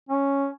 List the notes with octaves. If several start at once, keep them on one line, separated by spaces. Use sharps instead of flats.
C#4